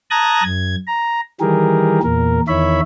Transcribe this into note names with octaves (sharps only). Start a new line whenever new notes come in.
A5 A#5 D#6 F#6 G#6 A#6
F#2 G#6
A#5
D#3 E3 G3 G4 G#4 A#4
E2 A#2 A#4
E2 D#3 E4 C#5 E5 B5